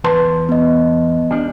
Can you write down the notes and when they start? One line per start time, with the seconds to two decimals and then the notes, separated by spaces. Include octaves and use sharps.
0.04 E2 B4 A5 C6
0.49 B3 D#5
1.31 G3 D4